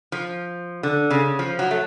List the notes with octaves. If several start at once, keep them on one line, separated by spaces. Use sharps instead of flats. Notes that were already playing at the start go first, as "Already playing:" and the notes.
F3
D3
C#3
F3
F#3
A3